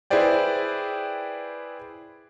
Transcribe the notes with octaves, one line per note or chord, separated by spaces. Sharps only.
E4 G#4 B4 C5 D5 G5